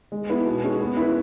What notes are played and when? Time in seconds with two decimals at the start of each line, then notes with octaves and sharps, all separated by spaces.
0.12 G#3
0.30 B3 E4 B4
0.46 B2
0.64 G#3 C#4 G#4
0.81 B3
0.97 E4 B4